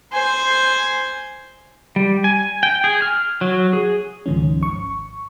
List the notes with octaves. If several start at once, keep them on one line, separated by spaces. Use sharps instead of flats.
C5 G#5
G3
G#5
G5
G#4
F6
F#3
G#4
C#2 G#2 D#3 F3 C#4
G#1 C#6